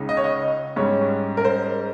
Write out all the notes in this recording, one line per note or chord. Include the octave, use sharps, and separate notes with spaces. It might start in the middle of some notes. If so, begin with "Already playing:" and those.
Already playing: C#2 C#3 G#3 D#4
D#5
C#5
D#5
G#2 G3 C#4 C#5
A#4
C5